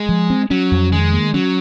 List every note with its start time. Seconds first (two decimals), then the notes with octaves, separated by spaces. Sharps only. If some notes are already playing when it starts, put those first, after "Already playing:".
Already playing: G#3
0.09 F3
0.30 C4
0.50 F#3 C#4
0.71 F2
0.92 D#3 G#3
1.13 A#3
1.34 F#3 C#4